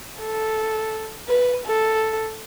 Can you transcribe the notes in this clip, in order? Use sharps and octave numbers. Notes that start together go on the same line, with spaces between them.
A4
B4
A4